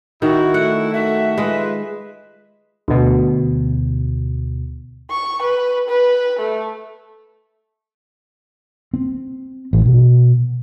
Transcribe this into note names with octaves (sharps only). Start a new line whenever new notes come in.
D#3 E4 F#4
A3 F#5
D#3 F#4 E5
G#3 F4 B4
D2 B2
C#6
B4
B4
A3
C4
A1
B2